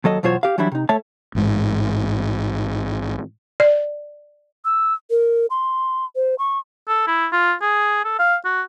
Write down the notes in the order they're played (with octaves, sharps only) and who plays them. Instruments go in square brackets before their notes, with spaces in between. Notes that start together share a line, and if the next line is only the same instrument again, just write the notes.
[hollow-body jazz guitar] D#2 F#3 A4 D#5
E2 B2 F#3 F4 C5 C#5
G4 F5
E3 F#3 G3 D4 E4
C3 D#4
A3 C#5 E5 A5
[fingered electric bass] A1 G#2
[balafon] D5
[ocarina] E6
A#4
C6
C5
C#6
[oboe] A4
E4
F4
G#4
A4
F5
F#4